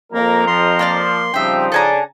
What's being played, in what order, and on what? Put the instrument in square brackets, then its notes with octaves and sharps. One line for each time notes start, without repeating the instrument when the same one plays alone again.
[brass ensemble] F2 A#5 [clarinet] A#3 [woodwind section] A#4
[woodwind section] F3 [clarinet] C6
[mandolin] A#3 D5 F6
[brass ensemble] C#3 G3 C4 [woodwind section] F3 D#4 [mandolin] E5 G5
[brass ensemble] C#3 D4 [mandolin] A4 G#5 A#5